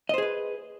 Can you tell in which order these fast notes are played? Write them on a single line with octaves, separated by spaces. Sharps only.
D#5 C5 G#4 B4